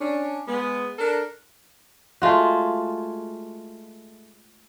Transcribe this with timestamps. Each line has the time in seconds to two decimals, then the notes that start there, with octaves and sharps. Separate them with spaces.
0.01 C#4 D4
0.48 G#3 B3
0.98 D4 A4 A#4
2.22 G#3 A3 F4 F#4